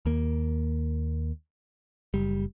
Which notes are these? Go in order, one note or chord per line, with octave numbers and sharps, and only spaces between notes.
D#2 A#3
F#1 G3